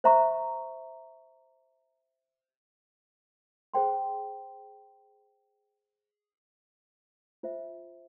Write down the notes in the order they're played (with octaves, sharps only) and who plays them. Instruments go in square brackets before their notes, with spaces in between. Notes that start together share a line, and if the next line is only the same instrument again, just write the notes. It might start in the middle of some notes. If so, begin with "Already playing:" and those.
[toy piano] C5 E5 A#5 C#6
G#4 C5 G5 C6
F4 C5 E5